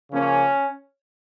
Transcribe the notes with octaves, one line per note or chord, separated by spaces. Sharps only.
C#3 F3 A#3 C#4